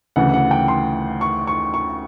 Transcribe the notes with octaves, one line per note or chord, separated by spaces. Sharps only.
D2 C#3 E3 F#5
F#5
G5
C6
C#6
C#6
C#6